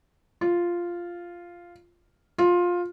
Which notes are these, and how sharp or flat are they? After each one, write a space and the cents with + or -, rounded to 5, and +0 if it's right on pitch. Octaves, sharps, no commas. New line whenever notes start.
F4 -5
F4 +15